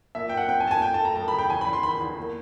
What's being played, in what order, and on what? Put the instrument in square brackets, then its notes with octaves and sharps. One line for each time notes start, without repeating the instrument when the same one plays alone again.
[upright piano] A#2 E5
A#2 G5
F#5
C4 G5
G#5
A#2 A5
G#5
A3 G5
A5
A3
A#5
F#2 A5
B5
C#3 G5
E2 G#5
E2 B5
C6
D#3 B5
E2
A#3